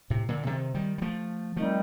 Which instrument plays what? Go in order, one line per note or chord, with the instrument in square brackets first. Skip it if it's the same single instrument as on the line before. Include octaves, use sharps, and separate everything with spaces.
[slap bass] A2 C3
A#2 D3
C3 D#3
D#3 G3
G3
F3 A3
[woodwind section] D#3 G3 C4 D#4 [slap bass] F3 A3